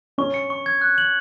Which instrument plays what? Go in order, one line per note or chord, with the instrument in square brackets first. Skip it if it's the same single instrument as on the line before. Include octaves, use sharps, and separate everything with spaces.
[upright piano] C#4 [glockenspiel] C#6
[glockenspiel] C#7
C#6
G#6
F#6
F#7